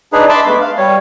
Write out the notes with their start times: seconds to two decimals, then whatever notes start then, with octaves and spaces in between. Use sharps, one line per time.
0.13 D4 D#4 G#4 B4
0.29 E5 A5 B5 C6 D6 E6
0.46 G#3 A3 B3 B4
0.61 F5
0.78 G3 C#5